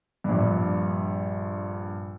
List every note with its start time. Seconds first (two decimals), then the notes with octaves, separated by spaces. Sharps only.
0.24 A#1 G2